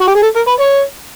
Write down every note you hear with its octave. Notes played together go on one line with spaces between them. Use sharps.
F#4
G4
G#4
A4
A#4
B4
C#5